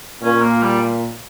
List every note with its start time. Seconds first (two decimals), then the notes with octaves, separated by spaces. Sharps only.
0.22 A#2 C#4
0.42 A#3
0.62 G3